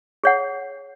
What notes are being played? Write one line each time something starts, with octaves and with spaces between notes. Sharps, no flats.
G#4 C#5 F#5